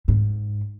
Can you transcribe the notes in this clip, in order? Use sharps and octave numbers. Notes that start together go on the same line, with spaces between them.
G#2